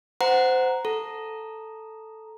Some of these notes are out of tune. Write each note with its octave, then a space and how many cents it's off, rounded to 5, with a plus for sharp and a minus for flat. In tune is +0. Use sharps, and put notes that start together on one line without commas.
C5 -20 F#5 +0 A#5 +0
A4 +0 A#5 +0